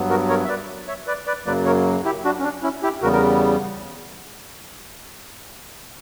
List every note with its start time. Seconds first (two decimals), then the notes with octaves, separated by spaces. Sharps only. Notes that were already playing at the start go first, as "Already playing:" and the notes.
Already playing: G2 F#3 B3
0.10 F#4 A#4
0.29 A#4 C#5
0.44 E5
0.48 B4 D5
0.88 C#5 E5
1.07 B4 D5
1.27 B4 D5
1.46 F#2 C#3 F#3 A#3 B4 D5
1.65 A#4 C#5
2.05 E4 G4
2.25 D4 F#4
2.40 C#4
2.43 D4
2.63 C#4 E4
2.83 E4 G4
3.02 E2 C#3 G3 B3 F#4 A#4
3.13 A#4